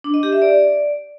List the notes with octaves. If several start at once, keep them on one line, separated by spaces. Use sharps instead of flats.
D4
D#5
G4
E5
D5